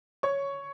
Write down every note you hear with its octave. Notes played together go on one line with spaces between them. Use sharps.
C#5 C#6